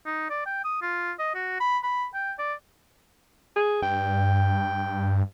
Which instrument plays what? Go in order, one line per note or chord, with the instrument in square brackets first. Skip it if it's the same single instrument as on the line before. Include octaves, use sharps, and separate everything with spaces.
[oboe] D#4
D5
G5
D#6
F4
D#5
F#4
B5
B5
G5
D5
[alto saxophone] G#4
[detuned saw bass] G2 [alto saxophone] G5